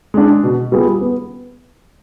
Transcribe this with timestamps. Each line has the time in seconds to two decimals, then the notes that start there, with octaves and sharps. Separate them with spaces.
0.14 G#3 D4
0.43 B2
0.72 G3 B3 F4 G#4
1.01 B3